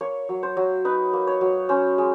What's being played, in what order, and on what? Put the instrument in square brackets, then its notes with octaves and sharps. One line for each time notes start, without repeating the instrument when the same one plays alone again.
[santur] A#3 C#5
F#3
C5
F#3
D#4 B4
A#3
C#5
F#3
C#4 C5
G#3